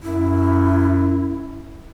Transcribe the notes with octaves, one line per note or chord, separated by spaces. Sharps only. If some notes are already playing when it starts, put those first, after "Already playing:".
F#2 E4